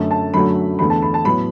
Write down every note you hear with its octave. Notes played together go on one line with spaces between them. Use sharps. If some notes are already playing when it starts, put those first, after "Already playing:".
Already playing: F#2 D3 A3
A5
F#2 D3 F#3 A3 B5
E2 D3 A3 B5
A5
B5
A5
A2 F#3 B3 B5